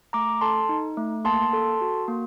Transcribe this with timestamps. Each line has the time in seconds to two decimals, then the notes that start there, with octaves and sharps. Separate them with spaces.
0.13 A3 A#5 D6
0.41 A4 A5 C6
0.69 D#4
0.97 A3
1.25 A#3 A5 C6
1.53 A4
1.81 F#4
2.08 A#3